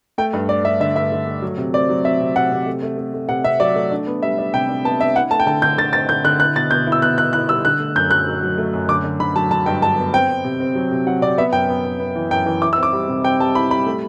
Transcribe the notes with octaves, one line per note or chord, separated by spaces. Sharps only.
A3 G5
G2
A3 D5
G2 E5
D3 E5
G2 E5
D3
A3
F#3
C3
C4 D5
F#3
C4 E5
C3
C3 F#5
C3
A3
A3
A3
A3
C3 F#5
C3 E5
F#3 D5
A3
D4
B3
G3 E5
D4
C3 G5
D4
B3 A5
D4 E5
E4 F#5
A3 A5
G5
D3 A5
D3 G6
D3 A6
C4 A6
D3 G6
D3 F#6
E4 F#6
B2 A6
B2 G6
E4
E6
B3 F#6
E4 F#6
E4 F#6
G3 E6
D3 F#6
A3
F#2 G6
F#3 F#6
F#3
F#3
A3
F#2
D3 D6
D3
D3 B5
F#3 A5
D3 A5
G2 G5
G2 A5
B3
C4 G5
C4
C3
C4
F#3
C3
F#3 F#5
C3 D5
B3 E5
F#2 G5
B3
B3
B3
E3
F#2 G5
E3
E4 D6
E6
C4 D6
G3
C3
C4 G5
G3 A5
E4 B5
G3 B5
A3